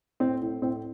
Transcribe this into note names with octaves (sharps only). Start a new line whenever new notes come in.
A2 C4
A2
A2 C4